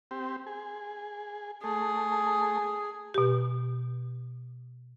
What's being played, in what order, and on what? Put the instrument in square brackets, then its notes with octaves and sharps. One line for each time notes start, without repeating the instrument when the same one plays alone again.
[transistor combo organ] C4 G4
G#4
[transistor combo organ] A3 [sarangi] G#4
[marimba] B2 G4